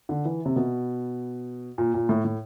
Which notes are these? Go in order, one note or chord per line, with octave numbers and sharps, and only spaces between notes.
D3
E3
C3
B2
A#2
A#2
A2
A2